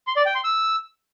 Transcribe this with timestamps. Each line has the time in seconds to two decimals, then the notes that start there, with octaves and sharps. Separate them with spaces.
0.07 C6
0.16 D5
0.26 G5
0.35 C6
0.44 E6